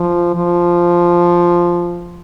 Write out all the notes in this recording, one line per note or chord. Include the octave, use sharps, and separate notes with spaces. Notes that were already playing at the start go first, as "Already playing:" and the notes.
Already playing: F3
F3